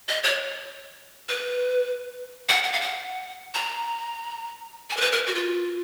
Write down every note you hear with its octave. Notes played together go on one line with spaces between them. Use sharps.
D#5
C#5
B4
F#5
F#5
F5
F#5
A#5
G#5
A#4
B4
A#4
F#4
F4